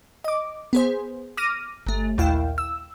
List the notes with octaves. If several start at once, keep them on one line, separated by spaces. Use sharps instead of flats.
D#5 D6
B3 G#4 C5
D6 F6 A#6 D#7
G1 A3
A#1 D#2 E4 F5 G5
E6